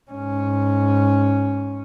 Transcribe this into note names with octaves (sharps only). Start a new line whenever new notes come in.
G#2 C#4